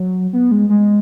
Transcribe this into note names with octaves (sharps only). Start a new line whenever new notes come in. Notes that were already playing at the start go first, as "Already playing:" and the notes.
Already playing: F#3
B3
G#3
G#3